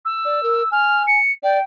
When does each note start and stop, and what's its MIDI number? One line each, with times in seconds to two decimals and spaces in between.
0.05 0.71 88
0.25 0.43 74
0.43 0.63 70
0.71 1.19 80
0.71 1.02 89
1.07 1.31 97
1.43 1.59 74
1.43 1.62 79